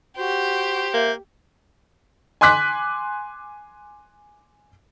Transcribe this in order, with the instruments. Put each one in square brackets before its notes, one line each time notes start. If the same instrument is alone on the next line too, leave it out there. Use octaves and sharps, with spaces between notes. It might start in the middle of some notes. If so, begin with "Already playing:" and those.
[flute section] F#4 [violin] G4 [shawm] C5
[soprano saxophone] A#3 [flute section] E5 F5 G6
[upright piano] G#5 C6 D6 F#6 B6